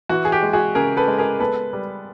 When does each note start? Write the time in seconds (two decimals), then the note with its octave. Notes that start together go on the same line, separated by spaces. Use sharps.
0.09 E3 F#4
0.25 G#4
0.32 G4
0.43 G#3
0.53 F#4 G#4
0.75 C#3 G#4 A#4
0.97 A4 B4
1.07 G#3
1.18 G#4 A#4
1.39 B3 A4 B4
1.73 G3